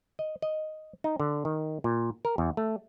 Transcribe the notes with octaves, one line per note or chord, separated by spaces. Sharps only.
D#5
D#5
D#4
D3
D#3
A#2
A#4
E2
A3